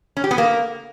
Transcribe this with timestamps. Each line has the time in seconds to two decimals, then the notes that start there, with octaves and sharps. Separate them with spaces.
0.17 C#4
0.24 G4
0.31 B3
0.38 A#3